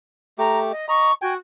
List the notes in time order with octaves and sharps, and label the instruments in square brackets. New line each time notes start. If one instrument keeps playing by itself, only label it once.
[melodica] A3 G4 [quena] A#5
[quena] D#5
[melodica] D#5 A#5 [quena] C#6
[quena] F#4 [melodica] G5 G#5